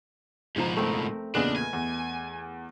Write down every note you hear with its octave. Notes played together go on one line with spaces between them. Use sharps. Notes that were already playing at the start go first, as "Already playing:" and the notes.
F#1 G#2 B2 F3 A#5
A3 C4 A#4
E2 A#2 C#3 D4 B4 D#5
G#5
E2